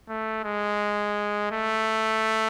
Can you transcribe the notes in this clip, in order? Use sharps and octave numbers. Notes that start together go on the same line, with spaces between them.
A3
G#3
A3